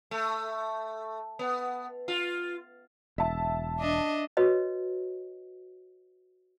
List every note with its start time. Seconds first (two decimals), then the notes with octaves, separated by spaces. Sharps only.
0.11 A3
1.39 B3
2.08 F4
3.18 E1 E5 A5
3.80 D4 D#5
4.37 F#4 B4 C#5 D#5